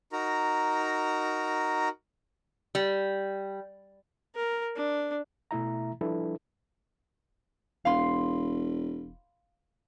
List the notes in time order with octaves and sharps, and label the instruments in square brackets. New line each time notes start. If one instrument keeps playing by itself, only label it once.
[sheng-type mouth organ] D#4 F#4 A#4 A#5
[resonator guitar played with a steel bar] G3
[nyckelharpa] A#4
D4
[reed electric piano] B2 A3 E4 E5 A#5
F3 G3 D4 E4 A4 B4
[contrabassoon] E1 [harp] F5 B5 C6